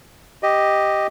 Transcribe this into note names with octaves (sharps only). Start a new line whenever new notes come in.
G4 D#5